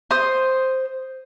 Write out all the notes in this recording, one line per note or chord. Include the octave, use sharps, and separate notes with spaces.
C5 D#6